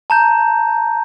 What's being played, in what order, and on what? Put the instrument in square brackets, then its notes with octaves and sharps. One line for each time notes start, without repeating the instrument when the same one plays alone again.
[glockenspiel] A5 A#5 G6